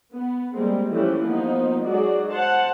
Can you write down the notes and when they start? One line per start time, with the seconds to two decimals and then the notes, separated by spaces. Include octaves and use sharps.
0.14 B3
0.52 G3 G#3 A#3 C4
0.90 E3 F3 G3 A3 C#4 G4
1.21 F3 A#3 B3 D#4
1.83 F#3 G#3 D#4 F#4 G#4 D5
2.31 C5 F#5 A5